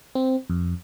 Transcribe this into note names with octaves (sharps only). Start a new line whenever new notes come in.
C4
F2